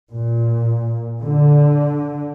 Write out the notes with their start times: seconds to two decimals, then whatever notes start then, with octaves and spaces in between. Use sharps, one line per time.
0.11 A#2
1.19 D3